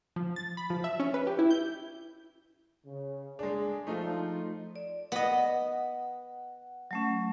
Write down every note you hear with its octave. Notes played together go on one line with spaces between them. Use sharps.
F3
A6
B5
F3
E5
C#4
B4
G4
E4
G6
C#3
G#3 D4 G#4
F3 A3 D#4 F4
D5
B3 D#5 F#5
F#3 A3 C#4